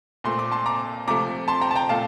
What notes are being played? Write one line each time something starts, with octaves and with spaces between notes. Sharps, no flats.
A#2 A3 C4 C6
D6
A5 C6
A#5 D6
C3 F3 A3 A#5 D6
A5 C6
G5 A#5
A5
G5 A#5
A#2 A3 F5 A5